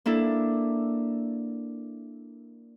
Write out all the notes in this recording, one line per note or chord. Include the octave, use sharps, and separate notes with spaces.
A#3 D4 E4 A4